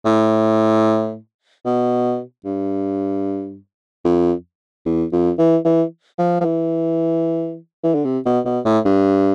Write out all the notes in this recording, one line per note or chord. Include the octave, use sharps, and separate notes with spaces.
A2
B2
G2
F2
E2
F2
E3
E3
F3
F3
E3
E3
D3
C3
B2
B2
A2
G2